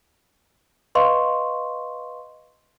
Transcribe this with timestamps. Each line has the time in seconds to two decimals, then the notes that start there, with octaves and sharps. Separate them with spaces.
0.95 B4 D#5 F5 C6 C#6